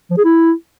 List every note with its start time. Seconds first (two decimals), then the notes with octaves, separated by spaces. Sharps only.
0.10 F3
0.17 G#4
0.24 E4